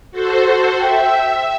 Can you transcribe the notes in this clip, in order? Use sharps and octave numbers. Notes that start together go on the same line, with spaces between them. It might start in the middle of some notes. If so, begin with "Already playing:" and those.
F#4 A4 C5
E5 G5